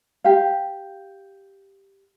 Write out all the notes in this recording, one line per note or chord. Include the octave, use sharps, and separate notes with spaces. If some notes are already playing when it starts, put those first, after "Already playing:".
G4 F5